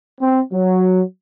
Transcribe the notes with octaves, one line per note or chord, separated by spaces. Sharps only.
C4
F#3